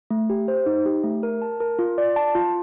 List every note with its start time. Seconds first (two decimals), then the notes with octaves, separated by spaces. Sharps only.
0.11 A3
0.30 G4
0.48 C5
0.66 D#4
0.86 G4
1.04 A3
1.23 A#4
1.42 A5
1.60 A#4
1.79 F4
1.98 D5
2.16 A5
2.35 F4